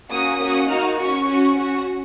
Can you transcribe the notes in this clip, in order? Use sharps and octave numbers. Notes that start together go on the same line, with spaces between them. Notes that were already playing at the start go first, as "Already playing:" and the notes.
A#3 C#4 F#4 D#6
A#3 C#4 F#4
A#3 D#4 F#4 F6
C#4 F#4 C#6
C#4 F#4
C#4 F#4